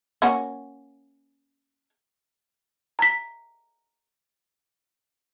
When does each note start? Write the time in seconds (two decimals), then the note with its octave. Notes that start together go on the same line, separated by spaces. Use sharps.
0.22 A#3 C#4 F#4
2.99 A#5 B6